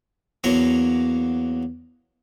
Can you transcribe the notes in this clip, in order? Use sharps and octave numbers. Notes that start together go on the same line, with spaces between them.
E2 F#3 A#3 C#5 A#5